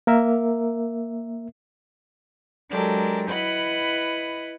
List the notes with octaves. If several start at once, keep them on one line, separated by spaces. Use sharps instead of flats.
A#3 A#4 E5
F#3 G#3 D4 G4 A4 A#4
E4 B4 D#5 F#5 B5